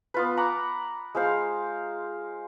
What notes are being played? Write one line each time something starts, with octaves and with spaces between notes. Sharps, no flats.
B3 F4 B4
F#5 A#5 B5 D6
G#3 F4 C5 F5